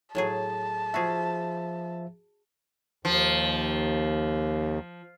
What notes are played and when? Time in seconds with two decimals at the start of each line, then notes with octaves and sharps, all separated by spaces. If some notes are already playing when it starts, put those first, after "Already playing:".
0.15 A2 F#3 G#4 A5
0.94 F3 F#4 G#4 E5
3.05 D#2 F3